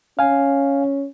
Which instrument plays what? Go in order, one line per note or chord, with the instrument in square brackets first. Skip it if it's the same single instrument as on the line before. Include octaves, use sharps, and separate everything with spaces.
[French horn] C#4 [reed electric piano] F5 G#5